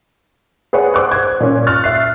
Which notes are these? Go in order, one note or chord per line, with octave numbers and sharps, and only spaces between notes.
G#4 B4 C#5 D5 F#5
C5 D6 F#6
G#6
A#2 C#4
C#6 F6 F#6 A6
E5 C7